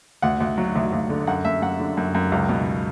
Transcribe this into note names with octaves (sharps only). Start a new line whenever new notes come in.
D2 F#5
D2
F#3
D2
D2
D3
F#2 F#5
F#2 E5
F#2 F#5
D3
F#2
F#2
C#2
B2